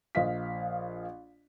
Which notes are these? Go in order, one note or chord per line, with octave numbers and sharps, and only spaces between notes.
A#1 D#5 F5 B6